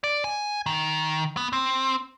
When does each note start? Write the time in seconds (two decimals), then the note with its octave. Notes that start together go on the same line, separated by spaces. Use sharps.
0.04 D5
0.24 G#5
0.66 D#3
1.37 B3
1.53 C4